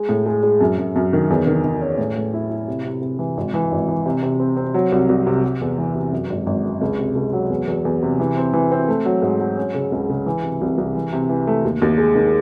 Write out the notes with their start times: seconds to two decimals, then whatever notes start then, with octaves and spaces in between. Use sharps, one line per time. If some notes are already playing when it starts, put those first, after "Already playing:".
Already playing: G#3
0.09 A2
0.26 G#3
0.43 G#3
0.61 F#2
0.78 F#2
0.96 F#2
1.13 D#3
1.30 E2
1.47 D#3
1.64 D#3
1.81 C#4
1.98 A2
2.16 A2
2.34 E4
2.50 E4
2.68 C3
2.85 C3
3.01 C3
3.19 E3
3.37 G#1
3.54 E3
3.72 G#1
3.88 E3
4.06 C3
4.23 C3
4.40 C4
4.57 C4
4.74 F#3
4.92 C2
5.09 C2
5.27 C3
5.44 C3
5.61 E2
5.78 E3
5.95 C3
6.12 F#2
6.30 G#1
6.46 G#1
6.64 F#2
6.81 C#2
6.99 C3
7.15 C#2
7.33 F#3
7.50 E2
7.67 E2
7.85 E2
8.02 C3
8.20 E3
8.37 C4
8.53 E3
8.72 C4
8.88 A3
9.05 F#3
9.22 G#2
9.40 F#3
9.57 C#4
9.74 C#3
9.92 C#2
10.09 C#3
10.26 E3
10.43 C3
10.61 C2
10.78 C2
10.95 E3
11.13 C3
11.29 E3
11.47 A3
11.64 D#2
11.82 D#2
11.98 G#3
12.15 D#3